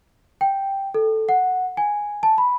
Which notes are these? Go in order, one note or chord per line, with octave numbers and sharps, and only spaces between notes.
G5
A4
F#5
G#5
A5
B5